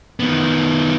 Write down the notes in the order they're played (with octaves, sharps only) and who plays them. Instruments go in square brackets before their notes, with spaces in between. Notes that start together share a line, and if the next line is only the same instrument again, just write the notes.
[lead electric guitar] D#3 B3